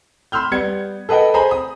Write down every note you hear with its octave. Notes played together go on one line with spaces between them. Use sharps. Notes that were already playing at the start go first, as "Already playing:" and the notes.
B5 C6 E6 F6 G6
G3 B3 D5 G#6 C#7
A4 B4 D#5 F#5 G5
G#4 C5 G#5 A#5 B5
D#6